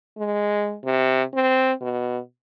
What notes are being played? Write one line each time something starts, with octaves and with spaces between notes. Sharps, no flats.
G#3
C3
C4
B2